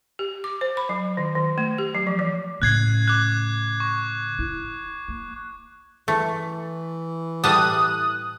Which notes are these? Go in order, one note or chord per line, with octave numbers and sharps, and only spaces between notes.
G4
D6
C5
B5
F#3
D#3
D#3
A3
G4
F#3
F3
E3
A2 C#3 F#6 G#6 C7
D6 F#6
C#6
E4
A#3
E3 A3
A2 G3 A5 D#6 F#6